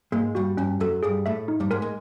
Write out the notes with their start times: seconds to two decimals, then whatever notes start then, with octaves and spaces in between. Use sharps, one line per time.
0.12 G#2 G#3 A#3
0.35 G2 G3 F#4
0.57 G2 G3 C#4
0.80 F#2 F#3 A4
1.03 G2 G3 G#4
1.26 A2 A3 E5
1.48 D#4
1.60 G2 G3
1.71 G#2 G#3 A#4
1.82 G#3